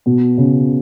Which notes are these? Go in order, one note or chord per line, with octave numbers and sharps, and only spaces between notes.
B2
C#3